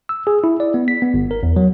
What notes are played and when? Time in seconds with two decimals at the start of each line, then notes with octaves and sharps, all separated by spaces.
0.09 E6
0.27 G#4
0.44 E4
0.60 D5
0.74 B3
0.88 B6
1.02 B3
1.14 G1
1.31 A#4
1.43 E2
1.56 F#3